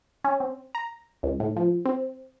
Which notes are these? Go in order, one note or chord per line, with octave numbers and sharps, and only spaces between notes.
C#4
C4
A#5
C#2
A2
F3
C4